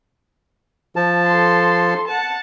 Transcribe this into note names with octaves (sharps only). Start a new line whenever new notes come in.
F3 A5
A4 C6
F#5 A5